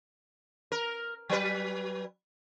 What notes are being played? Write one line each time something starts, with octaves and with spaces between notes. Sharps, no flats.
A#4
F#3 B4